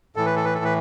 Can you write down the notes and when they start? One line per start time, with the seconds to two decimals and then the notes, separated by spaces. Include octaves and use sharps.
0.16 A2 E3 A4
0.26 B4
0.36 A4
0.45 B4
0.55 A4
0.64 B4